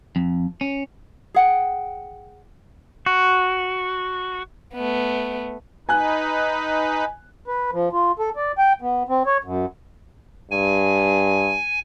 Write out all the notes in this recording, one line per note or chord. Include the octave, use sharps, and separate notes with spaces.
F2
C#4
G#4 F#5 G5
F#4
A3 B3
D#4 B4 G#5 F#6
B4
F3
F4
A4
D5
G5
B3
C4
C#5
F#2
G2 G#5